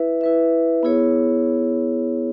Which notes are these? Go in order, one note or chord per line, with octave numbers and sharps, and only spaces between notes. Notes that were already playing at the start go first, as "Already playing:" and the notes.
Already playing: E4 B4 E5
E4 B4 E5
B3 E4 G#4 C#5